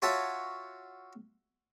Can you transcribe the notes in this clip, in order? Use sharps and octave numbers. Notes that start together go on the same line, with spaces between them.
F4 F#4 C#5 E5 A5